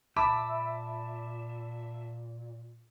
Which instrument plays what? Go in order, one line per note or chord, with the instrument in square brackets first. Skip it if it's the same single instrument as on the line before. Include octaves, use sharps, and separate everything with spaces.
[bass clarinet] A#2 [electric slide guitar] E5 [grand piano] A5 D6 [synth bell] B5